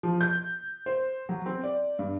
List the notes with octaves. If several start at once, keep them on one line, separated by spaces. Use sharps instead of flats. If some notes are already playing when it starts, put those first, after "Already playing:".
F3
G6
C5
F#3
C4
D5
G2